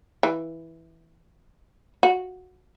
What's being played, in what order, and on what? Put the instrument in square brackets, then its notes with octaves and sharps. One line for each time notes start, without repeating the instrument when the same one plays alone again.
[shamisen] E3
F#4